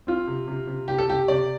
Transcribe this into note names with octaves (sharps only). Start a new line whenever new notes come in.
C4 F4
C3
C3
C3
C3 G4
A4
C3 G4
C3 D5